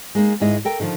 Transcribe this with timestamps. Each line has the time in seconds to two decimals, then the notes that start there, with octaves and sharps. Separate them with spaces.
0.15 G#3 A#3 D#4
0.40 D#2 G#2 G#3 E4 D#5
0.65 A4 A#4 G5
0.80 D3 D#3 F3 F4